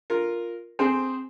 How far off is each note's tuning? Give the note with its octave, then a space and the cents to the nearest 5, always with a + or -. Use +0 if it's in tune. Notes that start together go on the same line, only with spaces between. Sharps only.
F4 +0 A#4 +0
C4 +0 G#4 +0 C5 -10